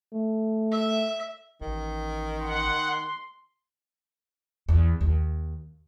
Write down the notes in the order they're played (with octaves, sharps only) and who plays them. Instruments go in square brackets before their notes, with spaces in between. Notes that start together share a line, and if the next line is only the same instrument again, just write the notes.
[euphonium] A3
[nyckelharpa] E5
[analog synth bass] A1 [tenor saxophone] D#3
[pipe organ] F#5 [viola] C6
[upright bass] E2
D#2